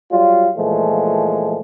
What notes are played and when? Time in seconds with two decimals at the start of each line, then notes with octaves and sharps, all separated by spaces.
0.12 F#3 G3 F4
0.56 A#2 E3 F3 G#3 A3